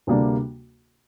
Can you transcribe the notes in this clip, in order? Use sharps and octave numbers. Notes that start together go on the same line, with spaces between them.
D2 C3 G3 A#3 D4